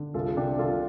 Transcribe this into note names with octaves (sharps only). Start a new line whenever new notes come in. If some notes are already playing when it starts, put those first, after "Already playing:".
Already playing: D3
C2 F4 A4
A4
C3 D4 G4
C2 F4 A4